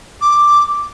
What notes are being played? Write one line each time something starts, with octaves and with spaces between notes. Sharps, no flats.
D6